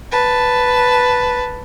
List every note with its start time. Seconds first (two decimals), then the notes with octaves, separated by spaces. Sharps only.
0.12 B4 A5